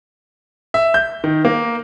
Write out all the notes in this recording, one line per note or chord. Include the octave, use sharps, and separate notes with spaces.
E5
G6
D#3
A#3